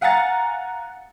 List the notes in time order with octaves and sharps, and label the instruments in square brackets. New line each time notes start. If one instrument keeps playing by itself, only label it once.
[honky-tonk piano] F5 F#5 G#5 A#5 A6 C#7